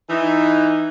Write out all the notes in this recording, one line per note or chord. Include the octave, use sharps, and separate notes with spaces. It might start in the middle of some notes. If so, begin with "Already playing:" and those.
E3 D#4